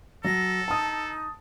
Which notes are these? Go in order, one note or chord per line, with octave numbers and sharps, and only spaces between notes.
F#3 A4 A#6
D#4 A5 D#6